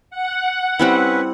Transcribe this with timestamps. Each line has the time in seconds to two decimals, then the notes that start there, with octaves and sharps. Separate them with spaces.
0.10 F#5
0.79 G3 C4 C#4 E4 B4